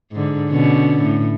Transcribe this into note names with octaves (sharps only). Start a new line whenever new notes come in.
G#2 D3
B2 D3 C#4
A2